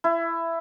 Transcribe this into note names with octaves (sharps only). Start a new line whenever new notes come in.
E4